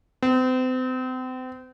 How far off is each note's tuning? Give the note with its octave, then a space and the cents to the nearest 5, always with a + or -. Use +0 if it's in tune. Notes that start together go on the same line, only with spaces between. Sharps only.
C4 -35